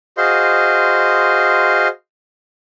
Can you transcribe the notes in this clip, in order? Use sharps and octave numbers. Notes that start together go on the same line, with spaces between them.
F#4 G#4 C5 D#5 F5 C6